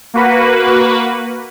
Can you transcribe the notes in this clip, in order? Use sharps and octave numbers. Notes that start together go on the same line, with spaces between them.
A#3 F#4 B4